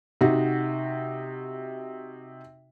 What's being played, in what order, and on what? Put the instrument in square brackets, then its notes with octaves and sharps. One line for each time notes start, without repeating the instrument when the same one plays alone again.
[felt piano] C3 D#4 F#4